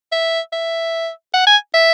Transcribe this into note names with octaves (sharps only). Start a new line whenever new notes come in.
E5
E5
F#5
G#5
E5